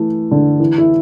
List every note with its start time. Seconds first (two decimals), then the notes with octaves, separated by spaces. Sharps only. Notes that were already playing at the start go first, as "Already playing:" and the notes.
Already playing: E3 A3
0.31 D3
0.60 E3
0.78 E4